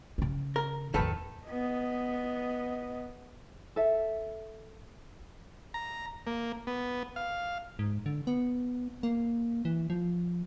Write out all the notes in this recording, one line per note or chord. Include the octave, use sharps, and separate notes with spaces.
C#3 C#4
A#4
A1 E2 D#3 A4 B4
B3 D#5
A4 E5
A#5
A#3
B3
F5
G#2
D3
B3
A#3
E3
F3